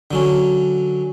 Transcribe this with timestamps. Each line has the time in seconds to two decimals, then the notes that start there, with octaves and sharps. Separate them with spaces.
0.11 D3 F#3 C#4